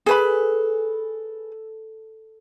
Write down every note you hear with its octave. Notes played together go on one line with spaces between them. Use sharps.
G#4 A4 B4 B5